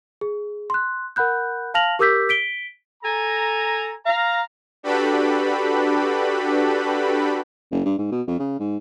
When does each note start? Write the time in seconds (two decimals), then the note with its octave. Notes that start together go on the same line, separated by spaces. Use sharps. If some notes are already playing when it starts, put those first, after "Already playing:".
0.21 G#4
0.70 C6 F#6
1.16 A#4 F#5 B5 F#6 G6
1.74 F5 A5 F6 A#6 F7 F#7
1.99 G4 A#4 D6 E6 G6 B6
2.29 B6 D7 G7
3.03 A4 G#5 A#5
4.06 F5 A#5
4.83 D4 F#4 G4 A4 B4 B5
7.71 F#1
7.85 G2
7.98 G#2
8.12 B2
8.28 F2
8.39 C#3
8.60 G#2